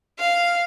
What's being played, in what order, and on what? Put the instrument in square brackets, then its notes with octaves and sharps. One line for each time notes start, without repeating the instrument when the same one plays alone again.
[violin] F5